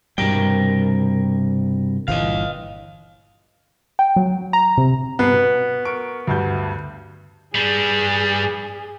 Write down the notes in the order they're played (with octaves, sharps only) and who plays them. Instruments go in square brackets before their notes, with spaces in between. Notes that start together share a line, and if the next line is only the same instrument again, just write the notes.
[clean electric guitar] C2 A#4 G5 [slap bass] G2 B2 G3
[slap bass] G1 A#2 E3 [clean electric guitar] D#5 F5
[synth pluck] G5
F#3
A#5
C3
[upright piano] G2 F#6 C7 [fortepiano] B3
[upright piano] B2
A#4 C#6 D7
D2 G2 G6
[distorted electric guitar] G2 G3 [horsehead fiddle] G#4